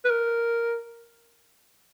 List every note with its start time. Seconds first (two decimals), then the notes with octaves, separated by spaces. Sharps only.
0.05 B4
0.10 A#4